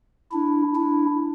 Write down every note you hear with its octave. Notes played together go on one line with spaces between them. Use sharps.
D4 E4
D4 E4